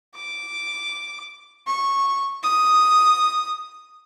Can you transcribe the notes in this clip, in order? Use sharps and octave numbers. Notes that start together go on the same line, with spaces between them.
D6
C#6
D#6